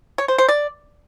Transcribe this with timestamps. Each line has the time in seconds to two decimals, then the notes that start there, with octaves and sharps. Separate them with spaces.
0.18 C#5
0.28 C5
0.38 C5
0.49 D5